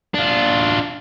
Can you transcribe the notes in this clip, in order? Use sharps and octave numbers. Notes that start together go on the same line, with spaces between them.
D4 F4